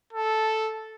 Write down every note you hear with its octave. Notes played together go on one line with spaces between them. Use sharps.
A4